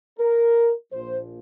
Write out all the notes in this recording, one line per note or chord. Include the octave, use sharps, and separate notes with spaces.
A#4
A#1 A#2 F3 C5